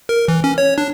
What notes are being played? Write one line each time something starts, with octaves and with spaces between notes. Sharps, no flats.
A#4
E3
C#4
C#5
D4